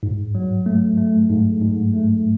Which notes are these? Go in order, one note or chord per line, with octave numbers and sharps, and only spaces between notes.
G#2
F#3
A3
A3
G#2
G#2
A3